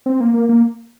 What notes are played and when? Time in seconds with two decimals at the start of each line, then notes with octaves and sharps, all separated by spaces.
0.06 C4
0.20 A#3
0.34 A#3
0.49 A#3